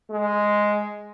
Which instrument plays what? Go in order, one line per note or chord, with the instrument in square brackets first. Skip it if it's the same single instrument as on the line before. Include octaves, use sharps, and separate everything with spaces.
[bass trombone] G#3